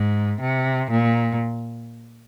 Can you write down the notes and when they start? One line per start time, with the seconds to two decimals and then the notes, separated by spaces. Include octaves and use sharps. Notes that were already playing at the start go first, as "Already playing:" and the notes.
Already playing: G#2
0.41 C3
0.90 A#2